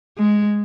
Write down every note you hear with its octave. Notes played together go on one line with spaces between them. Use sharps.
G#3